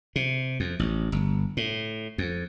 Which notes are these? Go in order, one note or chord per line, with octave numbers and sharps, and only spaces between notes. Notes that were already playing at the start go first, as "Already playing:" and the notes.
C3
F2
A1
G1
A2
F2